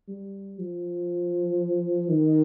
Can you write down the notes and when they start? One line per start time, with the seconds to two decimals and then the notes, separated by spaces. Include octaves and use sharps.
0.08 G3
0.59 F3
2.09 D#3